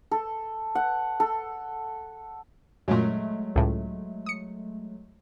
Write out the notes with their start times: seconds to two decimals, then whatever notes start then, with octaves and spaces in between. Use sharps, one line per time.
0.11 A4
0.75 F#5
1.20 A4
2.88 F#2 A#2 F#3 G#3 A3
3.56 C#2 A2
4.26 D#6 C#7